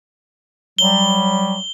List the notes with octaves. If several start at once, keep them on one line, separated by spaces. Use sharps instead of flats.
F#3 G3 G7